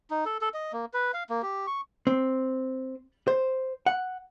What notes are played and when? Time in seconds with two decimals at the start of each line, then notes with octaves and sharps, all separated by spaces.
0.10 D#4
0.26 A4
0.41 A4
0.54 D#5
0.73 A#3
0.94 B4
1.13 F5
1.30 A#3
1.42 G4
1.67 C#6
2.07 C4
3.28 C5
3.86 F#5